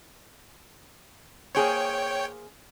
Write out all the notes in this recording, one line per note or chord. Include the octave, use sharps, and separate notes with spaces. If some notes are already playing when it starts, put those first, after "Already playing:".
A#3 G#4 C5 C#5 G5